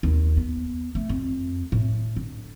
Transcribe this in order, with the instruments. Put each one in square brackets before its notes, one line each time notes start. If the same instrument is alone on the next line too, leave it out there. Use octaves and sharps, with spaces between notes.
[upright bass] D#2
B3
A3
F2
A2
D3